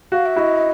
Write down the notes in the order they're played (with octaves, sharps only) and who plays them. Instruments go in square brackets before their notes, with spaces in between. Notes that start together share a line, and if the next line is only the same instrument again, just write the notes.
[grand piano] F#4 [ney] F5
[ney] E5
[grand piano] E4 F#4 [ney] D#5